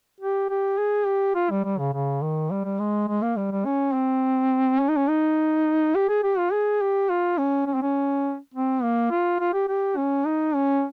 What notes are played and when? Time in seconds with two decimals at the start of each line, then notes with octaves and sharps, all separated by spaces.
0.20 G4
0.50 G4
0.78 G#4
1.06 G4
1.35 F4
1.50 G3
1.64 G3
1.78 C#3
1.93 C#3
2.22 D#3
2.51 G3
2.64 G3
2.79 G#3
3.08 G#3
3.22 A#3
3.37 G3
3.51 G3
3.65 C#4
3.94 C4
4.80 C#4
4.88 D#4
4.96 C#4
5.09 D#4
5.95 G4
6.09 G#4
6.23 G4
6.38 F4
6.52 G#4
6.81 G4
7.10 F4
7.38 C#4
7.67 C#4
7.75 C4
7.82 C#4
8.54 C4
8.82 A#3
9.11 F4
9.40 F4
9.53 G4
9.68 G4
9.97 C#4
10.26 D#4
10.54 C#4